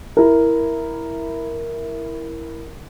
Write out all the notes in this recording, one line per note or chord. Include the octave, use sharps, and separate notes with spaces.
E4 A#4